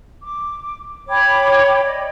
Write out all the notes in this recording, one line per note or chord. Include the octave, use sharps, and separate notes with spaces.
D6
C#5 G5 B5 D6
D5 D#5